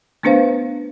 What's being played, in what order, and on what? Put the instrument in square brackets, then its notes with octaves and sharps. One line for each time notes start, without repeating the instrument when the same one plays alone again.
[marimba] A3 B3 D4 B4 C5 F5